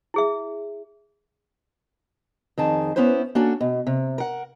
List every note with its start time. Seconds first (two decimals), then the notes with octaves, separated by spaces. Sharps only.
0.14 E4 G#4 E5
2.58 F2 D#3 G#4 A5
2.96 B3 C#4 E4 B4 C5
3.35 A#3 C#4 D4 F#4 A4
3.61 B2
3.87 C3
4.18 A#4 F#5